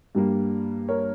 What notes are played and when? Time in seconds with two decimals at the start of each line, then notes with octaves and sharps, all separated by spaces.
0.15 G2 G3 A#3
0.88 A#4 C#5